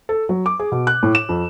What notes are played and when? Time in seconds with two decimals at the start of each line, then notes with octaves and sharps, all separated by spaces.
0.09 A4
0.29 F#3
0.46 D6
0.59 G#4
0.72 B2
0.87 F#6
1.03 A2
1.15 E7
1.29 F2